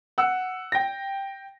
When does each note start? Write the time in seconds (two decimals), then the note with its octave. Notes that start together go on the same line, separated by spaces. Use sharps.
0.18 F#5 E6
0.72 G5 A#6